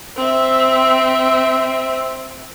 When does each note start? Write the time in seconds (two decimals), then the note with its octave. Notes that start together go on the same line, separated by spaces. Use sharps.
0.17 C4 E5